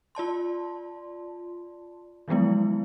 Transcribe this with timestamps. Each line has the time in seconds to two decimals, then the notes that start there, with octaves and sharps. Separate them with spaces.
0.15 F4 D5 A5 C6
2.28 D#3 F3 F#3 G#3 B3 E4